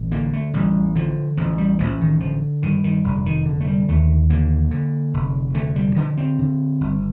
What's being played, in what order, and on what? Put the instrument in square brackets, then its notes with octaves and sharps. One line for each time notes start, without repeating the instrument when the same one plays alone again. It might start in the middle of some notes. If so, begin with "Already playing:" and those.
Already playing: [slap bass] A1
D3 A#3
A3
A1 G3
D3 F3
A1 F3
G3
A1 F3
D#3
D3 F3
G2 D#3
D#3
F1 D3
D#3
D3
A3
G3
D#2 A3
D3 A#3
D3
F1
D3 A3
G3
D3 F3
C4
D3
G1